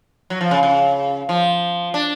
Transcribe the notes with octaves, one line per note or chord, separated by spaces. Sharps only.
F#3
F3
C#3
C#3
F3
D4